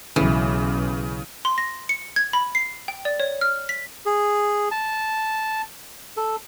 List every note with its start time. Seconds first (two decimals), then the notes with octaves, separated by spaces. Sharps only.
0.16 B1 C#3 E3
1.45 C6
1.58 A#6
1.89 C#7
2.16 G#6
2.33 B5
2.55 C7
2.88 G5
3.05 D5
3.20 C#5
3.41 F6
3.69 B6
4.06 G#4
4.71 A5
6.17 A4